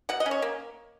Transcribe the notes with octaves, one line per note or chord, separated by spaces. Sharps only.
B2 F#5
D#5
C#4
C#5
A#3